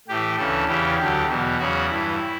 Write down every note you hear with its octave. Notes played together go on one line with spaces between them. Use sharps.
A2 E3 G4
D2 C#3 E3 A4
E2 C#3 E3 G4
D2 D3 F#3 G4
E2 B2 F#3
E2 C#3 F#3 F#4
G2 E3 E4